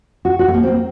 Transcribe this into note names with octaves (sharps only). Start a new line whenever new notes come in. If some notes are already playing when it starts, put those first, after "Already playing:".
F#4
F#4
A3
A#3
C4
A#3